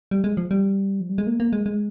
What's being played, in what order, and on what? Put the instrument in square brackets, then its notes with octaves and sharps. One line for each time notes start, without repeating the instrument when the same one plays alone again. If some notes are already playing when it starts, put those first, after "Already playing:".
[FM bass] G3
G#3
F3
G3
F3
G3
G#3
A#3
A#3
G#3
G#3